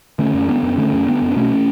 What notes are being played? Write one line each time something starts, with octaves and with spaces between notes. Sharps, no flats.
D3 A3 C#4
F#2
D3 B3 D4
F#2
D3 A3 C#4
F#2
D3 B3 D4
F#2
D4
B2 A3 C#4